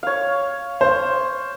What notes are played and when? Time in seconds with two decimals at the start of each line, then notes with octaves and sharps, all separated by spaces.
0.03 C#5 F5
0.81 C5